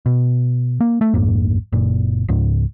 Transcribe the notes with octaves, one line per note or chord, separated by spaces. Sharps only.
B2
A#3
A3
A#1 F2 G#2 A#3
F#1 A#2
C#2 G#2